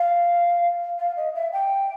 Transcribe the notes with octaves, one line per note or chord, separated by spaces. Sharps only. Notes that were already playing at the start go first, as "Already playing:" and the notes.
Already playing: F5
F5
D#5
E5
G5